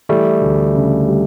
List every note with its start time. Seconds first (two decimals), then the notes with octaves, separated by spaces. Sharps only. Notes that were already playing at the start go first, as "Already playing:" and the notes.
0.09 E3 G3 A3
0.41 D2
0.75 C#3
1.08 G3